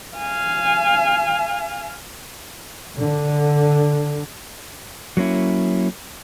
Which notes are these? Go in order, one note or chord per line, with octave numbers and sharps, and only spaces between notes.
F5 G#5
D3
F#3 A#3 C#4 E4